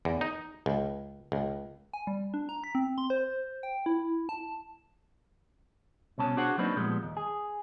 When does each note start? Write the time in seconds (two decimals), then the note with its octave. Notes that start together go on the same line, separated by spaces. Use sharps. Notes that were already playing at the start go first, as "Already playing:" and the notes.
0.05 E2
0.21 D#4
0.66 C#2
1.32 C#2
1.94 G#5
2.07 G3
2.34 D4
2.49 A#5
2.64 B6
2.75 C4
2.98 C6
3.10 C5
3.63 G5
3.86 E4
4.29 A5
6.18 C2 B2 C#4 A5
6.37 D4 F#4 G#4 C5 F#5
6.58 F#3 A#3 C4 D4 D#4 B4
6.77 A#2 F3 G3 G#3 B3
7.03 D#2
7.17 G#4